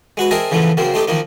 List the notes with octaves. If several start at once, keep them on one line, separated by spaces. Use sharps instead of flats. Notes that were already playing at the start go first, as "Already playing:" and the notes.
G#3 F#4 B4
C4 G#4 A#4 D#5 E5 A5
C#3 E3 F3 A3 B3
C#3 F#3 A#3 C4
A3 C4 D#4 G4 A4
D#3 F3 A#3 D#4